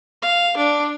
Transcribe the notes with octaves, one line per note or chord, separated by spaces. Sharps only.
F5
D4